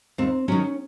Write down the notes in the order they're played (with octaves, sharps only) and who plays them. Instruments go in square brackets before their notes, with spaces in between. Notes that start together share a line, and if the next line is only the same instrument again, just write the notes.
[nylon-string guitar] D#2 C4
D#3 F#3 C#4